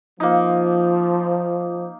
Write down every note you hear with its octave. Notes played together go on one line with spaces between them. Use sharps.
F3 A#3 D#4